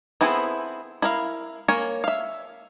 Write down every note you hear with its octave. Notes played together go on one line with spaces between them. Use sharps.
B3 C4 E4 G#4 A4
E4 A#4 F5
A#3 A#4 C#5 G#5
E5 F5